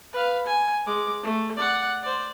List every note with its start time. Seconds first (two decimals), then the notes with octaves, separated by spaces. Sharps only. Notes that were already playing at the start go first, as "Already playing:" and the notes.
0.13 B4 F5
0.46 G#5
0.86 G#3 D6
1.23 A3
1.56 D5 F#5
2.03 C5 D5